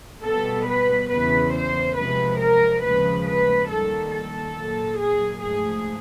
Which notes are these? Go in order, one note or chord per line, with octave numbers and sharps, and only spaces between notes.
B2 G3 B3 A4
B4
E2 C#3 E3 B4
C5
C3 F3 G#3 B4
A#4
D#2 C#3 F3 G#3 B4
B4
D#2 D#3 G3 A#3 A4
A4
A#2 F#3 A#3
G#4
G#2 F3 A3 G#4